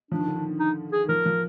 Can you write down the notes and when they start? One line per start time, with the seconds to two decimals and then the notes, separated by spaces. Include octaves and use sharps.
0.11 F3 D4
0.19 D#3
0.28 D3
0.36 D#3
0.59 D#4
0.92 G#4
1.04 D#3
1.09 F3 A#4
1.26 F3